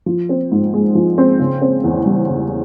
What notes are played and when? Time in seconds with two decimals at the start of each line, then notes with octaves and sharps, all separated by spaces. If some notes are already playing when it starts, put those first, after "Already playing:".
0.06 F3
0.29 C4
0.51 G#2
0.74 G#3
0.95 F3
1.18 C4
1.40 C#3
1.62 C4
1.84 E2
2.06 G3
2.28 C#3